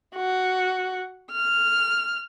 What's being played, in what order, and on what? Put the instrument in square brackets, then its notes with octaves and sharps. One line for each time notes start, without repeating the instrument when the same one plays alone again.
[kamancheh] F#4
F6